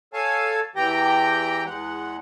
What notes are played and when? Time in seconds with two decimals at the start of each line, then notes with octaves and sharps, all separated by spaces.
0.13 A4 C#5 F5 G#5 A5
0.76 E2 E3 G4 G5 A#5
1.66 E2 G#3 F#5